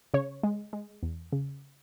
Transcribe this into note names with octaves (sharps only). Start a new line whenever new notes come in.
C#3 C#5
G#3
G#3
E2
C#3